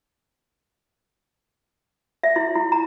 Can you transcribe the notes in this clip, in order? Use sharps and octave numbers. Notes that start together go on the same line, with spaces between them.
E5
E4
E4
A#5